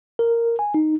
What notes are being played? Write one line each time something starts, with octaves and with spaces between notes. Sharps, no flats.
A#4
G#5
D#4